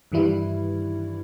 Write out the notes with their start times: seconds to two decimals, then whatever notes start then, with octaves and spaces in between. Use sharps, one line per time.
0.12 G2 D#3 E3 G3 E4